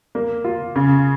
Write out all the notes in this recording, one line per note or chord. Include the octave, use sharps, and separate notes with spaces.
A#3
F4
C#3